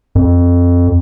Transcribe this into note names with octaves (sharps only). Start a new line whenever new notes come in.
F2